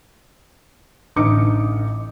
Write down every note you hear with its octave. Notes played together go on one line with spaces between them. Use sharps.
A1 D3 D#4 D6 D#6 C#7